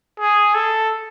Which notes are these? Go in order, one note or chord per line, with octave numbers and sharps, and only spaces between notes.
G#4
A4